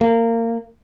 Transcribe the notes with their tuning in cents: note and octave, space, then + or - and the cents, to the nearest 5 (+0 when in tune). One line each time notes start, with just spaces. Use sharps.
A#3 -25